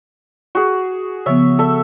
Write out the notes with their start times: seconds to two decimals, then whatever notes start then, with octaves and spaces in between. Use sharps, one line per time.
0.55 F#4 G#4
1.26 C#3 F3 B3 C#5 E5
1.59 A4 E5